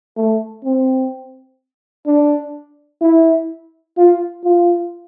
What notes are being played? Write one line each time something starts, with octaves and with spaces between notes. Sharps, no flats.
A3
C4
D4
E4
F4
F4